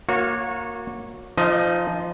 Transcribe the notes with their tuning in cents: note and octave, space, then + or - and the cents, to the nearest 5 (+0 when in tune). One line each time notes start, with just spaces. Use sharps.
A#3 +0 F#4 -30 C#5 -10
F3 -15 D#4 -30 D#5 +15